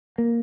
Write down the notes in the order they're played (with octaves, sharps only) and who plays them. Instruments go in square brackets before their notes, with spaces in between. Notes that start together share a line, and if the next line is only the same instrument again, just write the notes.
[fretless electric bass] A#3